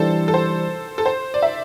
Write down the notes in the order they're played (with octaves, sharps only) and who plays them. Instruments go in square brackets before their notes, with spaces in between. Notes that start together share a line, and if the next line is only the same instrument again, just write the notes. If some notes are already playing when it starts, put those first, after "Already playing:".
Already playing: [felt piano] E3 G3 D4 [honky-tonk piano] A4 C5
[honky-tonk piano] A4
C5
A4
C5
D5
E5